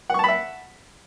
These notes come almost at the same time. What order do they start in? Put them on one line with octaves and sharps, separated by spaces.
F#5 C#6 A5 B5 E5